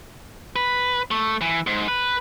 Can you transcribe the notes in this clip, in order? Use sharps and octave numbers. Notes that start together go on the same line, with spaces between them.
B4
A3
E3
G#2
B4